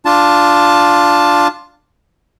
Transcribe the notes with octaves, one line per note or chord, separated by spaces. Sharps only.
D4 F4 A5